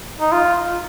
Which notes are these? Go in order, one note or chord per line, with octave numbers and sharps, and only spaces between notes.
D#4
F4